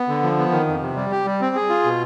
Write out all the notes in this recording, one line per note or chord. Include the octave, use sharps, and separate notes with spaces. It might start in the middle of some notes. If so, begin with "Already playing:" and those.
Already playing: B3
D3
F3
B3
D#3
F2
C3
G3
G4
G3
C4
G#4
F4
B2